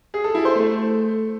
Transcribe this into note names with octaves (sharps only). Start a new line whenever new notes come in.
G#4
A4
E4
C5
A3